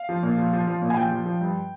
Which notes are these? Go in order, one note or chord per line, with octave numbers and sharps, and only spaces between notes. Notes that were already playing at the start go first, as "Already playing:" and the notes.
Already playing: F5
F3
A#2
F3
F3
F3
A#2
G#5
F3 G5
F3
F3
G2